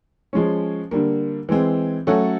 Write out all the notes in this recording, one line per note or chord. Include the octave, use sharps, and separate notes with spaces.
F3 G#3 C#4
D3 G3 A#3
E3 G#3 C4
F#3 A3 C#4 F#4 A4